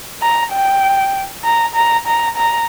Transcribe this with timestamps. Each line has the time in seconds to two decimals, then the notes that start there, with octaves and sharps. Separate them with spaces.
0.22 A#5
0.53 G5
1.44 A#5
1.75 A#5
2.07 A#5
2.37 A#5